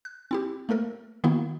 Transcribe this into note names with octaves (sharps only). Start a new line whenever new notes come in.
F#6
C4 E4 G4
A3 A#3 A4 A#4
D#3 A#3 B3 E4 F#4